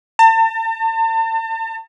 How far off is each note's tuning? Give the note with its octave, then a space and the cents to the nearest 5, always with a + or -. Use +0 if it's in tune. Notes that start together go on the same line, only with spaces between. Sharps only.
A5 +40